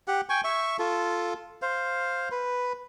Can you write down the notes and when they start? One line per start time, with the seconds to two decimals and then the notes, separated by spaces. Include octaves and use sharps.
0.08 G4 F#5
0.29 G5 G#5 C#6
0.44 E5 C#6
0.79 F4 A4
1.62 C5 F5
2.31 B4